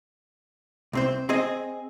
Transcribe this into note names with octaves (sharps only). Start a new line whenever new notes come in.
C2 C4 C5
C4 G#4 D#5